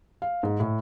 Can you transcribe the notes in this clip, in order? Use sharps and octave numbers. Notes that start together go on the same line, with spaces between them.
F5
G#2
A2